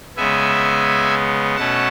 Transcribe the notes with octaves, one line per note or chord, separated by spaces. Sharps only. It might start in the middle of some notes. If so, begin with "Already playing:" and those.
C#3 G#3 B3 E5 G#5
B2 A3 C#4 F#5 A5